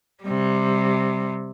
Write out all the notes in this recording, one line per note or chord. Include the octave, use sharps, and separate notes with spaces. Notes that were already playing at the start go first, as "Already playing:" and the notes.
C3 G3